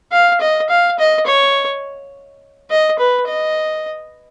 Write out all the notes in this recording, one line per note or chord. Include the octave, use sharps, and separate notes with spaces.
F5
D#5
F5
D#5
C#5
D#5
B4
D#5